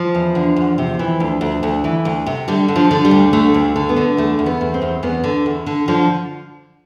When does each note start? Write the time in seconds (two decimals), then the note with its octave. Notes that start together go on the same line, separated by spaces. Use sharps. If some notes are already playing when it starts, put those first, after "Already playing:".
Already playing: F3
0.15 E2
0.35 D3
0.56 E2
0.78 C3
0.99 E3
1.20 D2
1.41 D2
1.63 D2
1.84 E3
2.05 D2
2.26 C3
2.48 D3 G3
2.68 D3
2.76 F3
2.91 D3
3.05 G3
3.11 D2
3.33 D3 A3
3.54 D2
3.76 D3
3.89 B3
3.96 D3
4.17 E2 A3
4.39 E2
4.46 B3
4.61 E2
4.74 C4
4.82 E2
5.03 E2 B3
5.24 D3
5.46 E2
5.66 D3
5.88 D3 F3